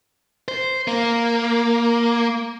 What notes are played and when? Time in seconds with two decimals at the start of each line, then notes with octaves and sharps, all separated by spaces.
0.48 C5
0.88 A#3